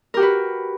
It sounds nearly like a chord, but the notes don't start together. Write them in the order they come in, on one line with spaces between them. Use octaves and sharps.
A#4 G4 F#4 B4